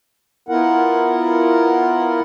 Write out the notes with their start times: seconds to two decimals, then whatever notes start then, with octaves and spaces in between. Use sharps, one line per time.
0.49 B3 E4 F4 A#4 F#5